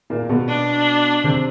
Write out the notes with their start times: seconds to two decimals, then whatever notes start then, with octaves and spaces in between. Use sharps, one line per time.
0.10 A#2 A#3
0.29 B2 B3
0.48 D4
1.24 C3 C4